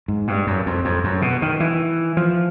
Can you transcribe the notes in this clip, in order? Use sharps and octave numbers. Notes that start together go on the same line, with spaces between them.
G#2
G2
F#2
F2
F2
F#2
B2
D#3
E3
F3